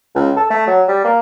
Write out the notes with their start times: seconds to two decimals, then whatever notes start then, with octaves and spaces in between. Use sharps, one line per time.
0.15 C#2
0.36 A4
0.50 A3
0.67 F#3
0.88 G3
1.04 A#3